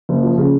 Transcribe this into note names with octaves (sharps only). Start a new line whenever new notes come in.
F#1
F3
C#3